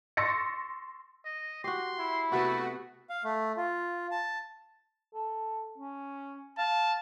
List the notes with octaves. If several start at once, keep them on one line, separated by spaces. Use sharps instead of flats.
C6 C#6 E6 A6 A#6 C#7
D#5
F#4 G4 C6
E4
C3 A3 B3 F#4
F5
A3
F4
A5
A4
C#4
F5 A5